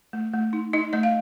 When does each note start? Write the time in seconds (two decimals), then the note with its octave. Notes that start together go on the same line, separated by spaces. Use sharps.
0.13 A3
0.33 A3
0.53 D#4
0.73 D#4 D#5
0.93 A3 D#5
1.03 F5